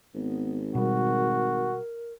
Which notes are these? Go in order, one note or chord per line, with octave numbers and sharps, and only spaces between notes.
G#1 B3
B2 G3 F#4 A#4